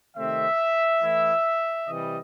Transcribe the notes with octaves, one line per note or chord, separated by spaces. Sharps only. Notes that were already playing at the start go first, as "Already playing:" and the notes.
C3 D#3 A3 C4 E5
E3 A3 E4
C3 E3 G3 D#5